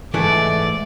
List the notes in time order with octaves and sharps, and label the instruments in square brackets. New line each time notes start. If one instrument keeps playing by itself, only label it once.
[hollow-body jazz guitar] G#2 E3 A3 [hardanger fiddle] D5